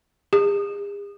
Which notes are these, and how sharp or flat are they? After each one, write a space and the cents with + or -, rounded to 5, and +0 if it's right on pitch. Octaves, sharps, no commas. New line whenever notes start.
G#4 -45